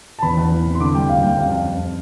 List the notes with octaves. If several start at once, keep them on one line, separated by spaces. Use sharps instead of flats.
A5
E2 B5
E2
E3
C3
C6
D3 D6
G3 G5
D2 F5
G3 G5
F2 F5
F2
F2